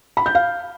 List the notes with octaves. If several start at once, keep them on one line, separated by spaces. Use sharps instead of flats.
B5
G6
F5